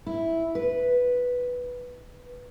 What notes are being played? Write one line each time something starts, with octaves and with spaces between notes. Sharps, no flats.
E4
B4